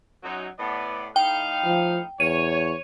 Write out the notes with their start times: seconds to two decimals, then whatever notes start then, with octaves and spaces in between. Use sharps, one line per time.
0.23 F#2 F#3 D#4
0.59 A2 B3 D5
1.16 A2 D#4 F5 G5
1.65 F3
2.20 E2 C#5 D#7